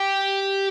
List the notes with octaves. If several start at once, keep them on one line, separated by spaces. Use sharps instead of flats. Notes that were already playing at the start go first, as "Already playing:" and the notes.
Already playing: G4